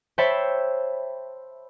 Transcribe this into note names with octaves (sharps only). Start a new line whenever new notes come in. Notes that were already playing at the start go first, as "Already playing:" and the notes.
C5 C#5 E5 G5 A5 B5